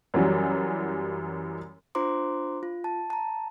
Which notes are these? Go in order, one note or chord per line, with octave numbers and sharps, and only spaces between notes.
F#2 E3 F#3 G3
D4 F4 C5 A#5 C6 D6
F4
A5
A5 A#5